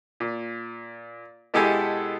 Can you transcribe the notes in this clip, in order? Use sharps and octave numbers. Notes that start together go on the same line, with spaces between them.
A#2
B2 G#3 E4 G4 A4 G#5